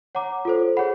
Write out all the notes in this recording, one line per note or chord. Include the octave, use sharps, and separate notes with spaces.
C#5 F#5 A#5 D6
F4 A4 C5
G#4 C#5 F#5 B5